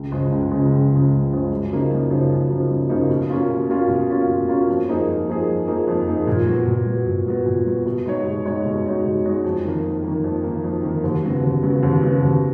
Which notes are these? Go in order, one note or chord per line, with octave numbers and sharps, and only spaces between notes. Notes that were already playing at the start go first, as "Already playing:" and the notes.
Already playing: C#2
C#3 F3 G#3
C#2
C#3 F3 G#3
C#2
C#3 F3 G#3
C#2
C#3 F3 G#3
F#2
C#3 F3 A#3 D#4
F#2
C#3 F3 A#3 D#4
F#2
C#3 F3 A#3 D#4
F#2
C#3 F3 A#3 D#4
B2
A#3 C#4 F4
B2
A#3 C#4 F4
B2
A#3 C#4 F4
B2
A#3 C#4 F4
F2
F3 A#3 D#4 G#4
F2
F3 A#3 D#4 G#4
F2
F3 A#3 D#4 G#4
F2
F3 A#3 D#4 G#4
A#2
F#3 B3 F#4
A#2
F#3 B3 F#4
A#2
F#3 B3 F#4
A#2
F#3 B3 F#4
B2
G#3 D#4 F#4 C#5
B2
G#3 D#4 F#4 C#5
B2
G#3 D#4 F#4 C#5
B2
G#3 D#4 F#4 C#5
F2
D#3 A#3
F2
D#3 A#3
F2
D#3 A#3
F2
D#3 A#3
D#2
C#3 F#3 B3 F#4
D#2
C#3 F#3 B3 F#4
D#2
C#3 F#3 B3 F#4
D#2